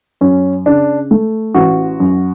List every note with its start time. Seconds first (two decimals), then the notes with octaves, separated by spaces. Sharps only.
0.21 F#2 C#4
0.66 C#3 D4
1.11 A3
1.54 A1 F#4
2.00 F#2